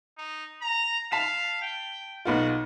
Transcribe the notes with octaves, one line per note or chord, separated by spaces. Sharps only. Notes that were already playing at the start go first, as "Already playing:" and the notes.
D#4
A#5
F5 A5 B6 E7
G5
B1 B3 F4 F#4